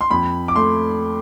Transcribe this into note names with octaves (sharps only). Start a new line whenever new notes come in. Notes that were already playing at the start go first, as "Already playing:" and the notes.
C6
F2 B5
D6
A3 C6